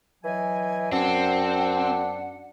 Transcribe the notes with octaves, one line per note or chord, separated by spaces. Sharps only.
E3 F#3 D#5 G#5
F#2 C4 D4 F#5